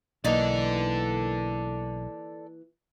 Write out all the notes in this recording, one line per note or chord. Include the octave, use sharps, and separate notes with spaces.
B1 E3 A#3 D#4 A4 D5